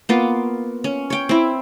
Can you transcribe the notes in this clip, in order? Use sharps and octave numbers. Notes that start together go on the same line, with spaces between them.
A#3 B3 F4
C#4
C#5 G5
C4 E4